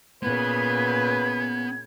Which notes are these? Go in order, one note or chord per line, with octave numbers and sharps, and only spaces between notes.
A#2 C#3 B3 B4 G#6